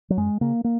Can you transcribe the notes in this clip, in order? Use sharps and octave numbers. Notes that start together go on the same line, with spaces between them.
F#3
F#2 G#3
C#3 A#3
A#3